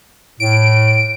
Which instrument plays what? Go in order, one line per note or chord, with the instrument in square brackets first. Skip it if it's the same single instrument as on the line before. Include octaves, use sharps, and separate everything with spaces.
[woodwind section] A2 [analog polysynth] D7